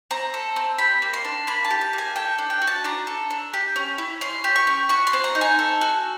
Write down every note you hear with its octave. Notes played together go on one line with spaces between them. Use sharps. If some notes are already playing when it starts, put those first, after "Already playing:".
C4 A#5
A4
C4
G4 B5
A#3
C6
D4
A#3 B5
A5
G4
A5
A#3
G#5
A4 G5
D4
G5
F#4
A5
D4 A#5
A4
D4
G4
C#4
E4
C#4 C6
G4
C#6
C#4
F#4 C#6
C6
C4
A#5
D#4
G#5
A4
F#4